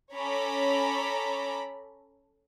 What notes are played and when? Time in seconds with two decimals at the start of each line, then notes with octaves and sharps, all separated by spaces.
0.14 C#4 A4 C#5 A#5 B5 D6